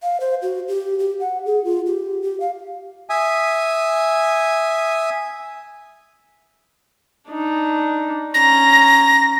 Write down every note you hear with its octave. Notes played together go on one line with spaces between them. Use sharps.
F5
C5
F#4
G4
G4
F#5
G#4
F4
G4
G4
F5
E5 G#5 D#6
D4 D#4
C#4 A#5 A#6